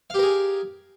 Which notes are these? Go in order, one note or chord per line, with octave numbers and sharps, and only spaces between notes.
G4 G#4 A#4 F5